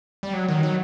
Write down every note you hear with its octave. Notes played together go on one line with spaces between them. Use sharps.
G3
F#3
D#3
F#3